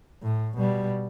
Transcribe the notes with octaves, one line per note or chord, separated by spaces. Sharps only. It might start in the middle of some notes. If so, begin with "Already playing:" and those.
A2
B2 G3